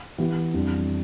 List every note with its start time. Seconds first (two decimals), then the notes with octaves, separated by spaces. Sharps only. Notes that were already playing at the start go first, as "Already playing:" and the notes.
0.18 E3 B3 E4 G4
0.54 F2 E3 G3 D4